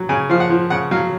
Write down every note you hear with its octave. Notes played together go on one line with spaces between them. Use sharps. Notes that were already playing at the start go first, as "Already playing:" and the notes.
Already playing: F#3
C#3 G#5
F3 F5
F#5
F3
C#3 F#5
F#3 F5